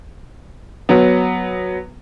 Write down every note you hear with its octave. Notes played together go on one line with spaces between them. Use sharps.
F#3 B3